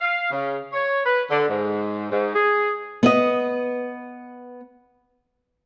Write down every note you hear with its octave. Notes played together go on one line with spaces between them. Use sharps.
F5
C#3
C#5
B4
D3
G#2
G#2
G#4
B3 B4 D#5